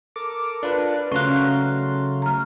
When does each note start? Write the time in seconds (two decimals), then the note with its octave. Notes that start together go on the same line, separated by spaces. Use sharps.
0.16 A4 A#4 D6
0.63 D4 F4 B4
1.12 C#3 F#3 A3 C#4 F5 A#5 C6 F#6
2.22 A#5 F6